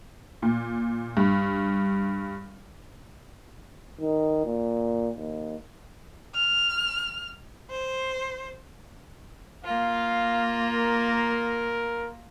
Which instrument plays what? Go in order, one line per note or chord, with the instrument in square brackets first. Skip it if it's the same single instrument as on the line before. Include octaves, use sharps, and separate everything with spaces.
[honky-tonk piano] A#2
G2
[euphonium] D#3
A#2
D#2
[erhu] F6
C5
[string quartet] A#3 F4 [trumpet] F5
[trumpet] A#4